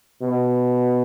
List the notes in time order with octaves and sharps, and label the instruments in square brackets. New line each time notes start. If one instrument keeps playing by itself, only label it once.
[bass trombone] B2